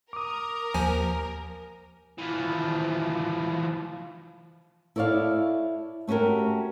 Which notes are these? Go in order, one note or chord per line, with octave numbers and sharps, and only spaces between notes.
A#4 D6 D#6
D#2 F3 G#5
E3 F3
E4 A4 C#5 D5 F5
A3 C#4 F#4 G4 A#4